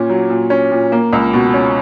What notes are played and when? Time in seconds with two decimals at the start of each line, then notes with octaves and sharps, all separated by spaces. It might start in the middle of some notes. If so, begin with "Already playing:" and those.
Already playing: A#2 C#4
0.10 F#3
0.30 A#2
0.50 C#4
0.71 A#2
0.92 A#3
1.13 C#2
1.33 B2
1.54 C#4